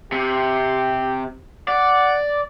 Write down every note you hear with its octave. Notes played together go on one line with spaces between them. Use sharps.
C3 G4
D5 F#5